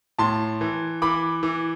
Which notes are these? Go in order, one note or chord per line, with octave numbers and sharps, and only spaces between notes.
A2 A5 C6
E3
E3 B5 D6
E3